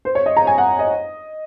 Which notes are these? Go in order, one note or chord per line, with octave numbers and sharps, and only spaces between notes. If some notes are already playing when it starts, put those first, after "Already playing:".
C5
C#5
D#5
A#5
G#5
F#5
D#5